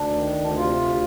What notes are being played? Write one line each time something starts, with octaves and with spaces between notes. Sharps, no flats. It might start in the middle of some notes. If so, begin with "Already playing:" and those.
Already playing: D2 D4
D#3
D2
C3 F4
D2